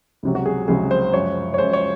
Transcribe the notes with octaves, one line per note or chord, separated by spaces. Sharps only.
C#2 C3 F#3
F#4
G#4
C#2 C3 F#3 G#4
C5
F#2 F3 G#3 C#5
C#5
F#2 F3 G#3 C5
C#5